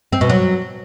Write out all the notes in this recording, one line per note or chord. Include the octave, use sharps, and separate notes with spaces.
C4
B2
F#3